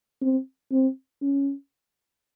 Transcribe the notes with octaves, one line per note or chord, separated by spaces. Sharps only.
C4
C4
C#4